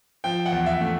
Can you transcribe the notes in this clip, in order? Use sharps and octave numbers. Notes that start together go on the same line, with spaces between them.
F3 G5
F#5
E2
E5
A3